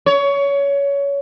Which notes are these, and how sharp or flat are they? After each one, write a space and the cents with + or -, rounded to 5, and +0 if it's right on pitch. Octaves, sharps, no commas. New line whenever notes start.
C#5 +20